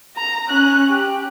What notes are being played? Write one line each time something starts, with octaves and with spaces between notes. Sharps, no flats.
A#5
C#4 F#6
G4